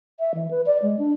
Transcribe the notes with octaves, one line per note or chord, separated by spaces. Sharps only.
E5
E3
B4
D5
G#3
D4